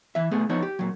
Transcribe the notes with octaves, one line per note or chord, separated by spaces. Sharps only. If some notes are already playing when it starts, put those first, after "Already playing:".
E3 E5
B2 A3 B3 G#4
F3 B3 D#4 C#5
G4
A#2 F#3